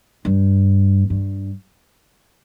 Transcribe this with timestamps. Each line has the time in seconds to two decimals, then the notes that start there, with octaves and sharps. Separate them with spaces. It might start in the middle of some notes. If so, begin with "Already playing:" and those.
0.25 G2
1.10 G2